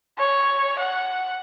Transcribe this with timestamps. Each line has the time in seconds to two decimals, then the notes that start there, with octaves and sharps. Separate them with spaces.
0.18 C#5
0.79 F#5